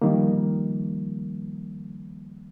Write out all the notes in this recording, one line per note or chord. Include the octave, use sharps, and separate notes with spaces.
D#3 F3 G3 A#3